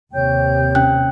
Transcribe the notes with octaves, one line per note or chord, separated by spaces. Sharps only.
D#2 C3 C#5 G5 G6
C#4 G5 F#6